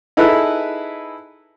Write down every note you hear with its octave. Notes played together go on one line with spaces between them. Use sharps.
D#4 E4 G#4 A4 B4